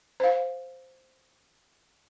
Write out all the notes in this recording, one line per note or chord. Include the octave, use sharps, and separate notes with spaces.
C5 F5